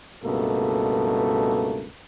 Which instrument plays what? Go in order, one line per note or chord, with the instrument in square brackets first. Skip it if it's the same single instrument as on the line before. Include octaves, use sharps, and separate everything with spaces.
[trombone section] C#2 G2 B2 A3 A#3 A4